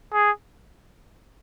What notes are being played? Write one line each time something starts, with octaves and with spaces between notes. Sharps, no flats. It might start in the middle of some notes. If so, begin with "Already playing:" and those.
G#4